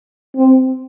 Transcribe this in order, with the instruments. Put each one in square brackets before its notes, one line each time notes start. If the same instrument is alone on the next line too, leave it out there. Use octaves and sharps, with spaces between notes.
[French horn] C4